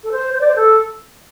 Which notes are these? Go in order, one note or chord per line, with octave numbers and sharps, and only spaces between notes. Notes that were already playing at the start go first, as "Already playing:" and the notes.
A4
C5
C5
D5
C5
A4